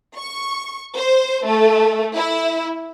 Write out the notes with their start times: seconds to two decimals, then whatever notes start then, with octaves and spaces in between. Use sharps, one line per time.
0.16 C#6
0.96 C5
1.47 A3
2.15 E4